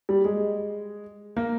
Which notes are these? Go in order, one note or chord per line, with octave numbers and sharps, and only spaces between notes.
G3
G#3
A#3